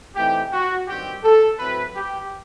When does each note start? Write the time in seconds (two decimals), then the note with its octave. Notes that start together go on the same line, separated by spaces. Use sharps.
0.16 E3 A3 C4 D#4 G4
0.52 F#4
0.87 G2 D#3 G3 C4 G4
1.23 A4
1.59 A2 F#3 C4 E4 B4
1.96 G4